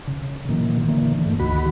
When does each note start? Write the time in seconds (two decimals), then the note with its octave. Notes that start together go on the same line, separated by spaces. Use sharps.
0.08 C#3
0.49 A#2 D#3 E3 F#3 A#3
0.88 D3 E3 A#3
1.26 G2 A3
1.39 D2 D#3 F#4 B5